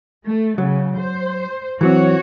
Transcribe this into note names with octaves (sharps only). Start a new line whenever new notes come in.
A3
C#3 F#3
C5
E3 F#3 C4 F#4 C#5